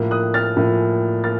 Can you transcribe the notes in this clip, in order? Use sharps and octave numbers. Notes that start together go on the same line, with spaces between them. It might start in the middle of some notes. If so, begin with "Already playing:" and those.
Already playing: A2 F3 A#3
D#6 F#6
F6 A6
A2 F3 A#3
A#3 F6 A6